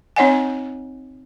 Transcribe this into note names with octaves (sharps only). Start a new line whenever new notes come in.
C4 D#4 C#5 D#5 F#5 G#5